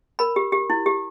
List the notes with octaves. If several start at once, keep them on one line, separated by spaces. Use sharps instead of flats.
A#4 B5
G4
G4
E4
G4